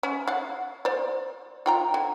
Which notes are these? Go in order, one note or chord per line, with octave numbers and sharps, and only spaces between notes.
C#4
F5 F#5
C5 D5
F4 G5 A#5
D3